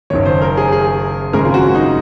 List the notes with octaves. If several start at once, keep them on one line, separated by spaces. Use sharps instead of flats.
F#1 F#2 D#3 C#5
C5
A#4
G#4
G#4
G#1 F#2 C#3 G#3 A#4
F4
F#4
D#4